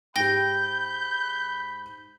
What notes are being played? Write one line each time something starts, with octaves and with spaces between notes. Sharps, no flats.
G#2 G4 G5 B5 G6 A#6 G7